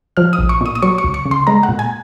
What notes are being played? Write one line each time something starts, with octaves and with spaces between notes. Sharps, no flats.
F3 F6
D#6
A#1
C#6
A#2 D#6
D#6
F#3 C#6
C#6
C#2
C#6
C#3
C6
G#3 A#5
F#5
A#2
G#5